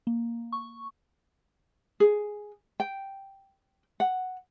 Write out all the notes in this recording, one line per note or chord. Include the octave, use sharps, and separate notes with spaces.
A#3
C#6
G#4
G5
F#5